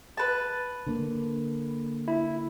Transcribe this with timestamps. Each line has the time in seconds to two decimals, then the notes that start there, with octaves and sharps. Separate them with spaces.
0.17 B4 A5
0.86 D3 A#3
2.08 E4